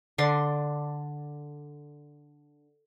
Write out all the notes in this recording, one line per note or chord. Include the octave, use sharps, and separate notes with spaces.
D3 D4 C6